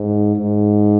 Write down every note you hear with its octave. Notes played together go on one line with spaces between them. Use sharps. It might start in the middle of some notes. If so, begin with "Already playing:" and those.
Already playing: G#2
G#2